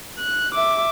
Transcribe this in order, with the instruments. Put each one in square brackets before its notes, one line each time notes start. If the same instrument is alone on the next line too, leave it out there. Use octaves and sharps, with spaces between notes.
[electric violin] F#6
E5 D6